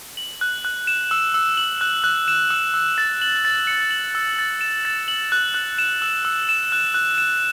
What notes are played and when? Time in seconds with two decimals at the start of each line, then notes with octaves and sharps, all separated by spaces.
0.17 F#7
0.41 F#6
0.65 F#6
0.87 E7
1.11 E6
1.34 E6
1.57 F#7
1.81 F#6
2.04 F#6
2.28 E7
2.50 E6
2.74 E6
2.98 A6
3.22 F#7
3.45 A6
3.67 C#7
3.91 F#7
4.15 E6
4.39 A6
4.61 E7
4.85 A6
5.08 F#7
5.32 F#6
5.54 F#6
5.79 E7
6.02 E6
6.25 E6
6.49 E7
6.72 F#6
6.94 F#6
7.18 E7